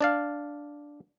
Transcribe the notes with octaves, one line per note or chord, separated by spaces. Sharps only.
D4 D5 F5